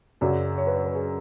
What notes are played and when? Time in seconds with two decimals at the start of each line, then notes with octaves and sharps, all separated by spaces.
0.21 F#2 C#3 F#3 D5
0.58 C#5
0.67 B4
0.76 C#5
0.85 B4
0.95 G#4